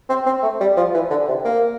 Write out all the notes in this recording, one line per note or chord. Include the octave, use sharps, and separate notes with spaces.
C4
C4
A3
G3
F3
E3
D3
C3
A#3